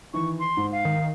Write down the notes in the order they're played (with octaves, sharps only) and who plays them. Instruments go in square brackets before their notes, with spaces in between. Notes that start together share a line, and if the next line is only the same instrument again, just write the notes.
[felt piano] D#3 E3 [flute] C#6
[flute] C6
[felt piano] G#2
[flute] F5
[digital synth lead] D#3